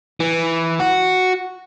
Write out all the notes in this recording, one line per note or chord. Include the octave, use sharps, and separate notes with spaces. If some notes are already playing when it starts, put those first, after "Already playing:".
E3
F#4